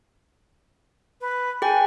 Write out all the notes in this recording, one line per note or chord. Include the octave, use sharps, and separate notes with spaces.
B4
G#4 G5 G#5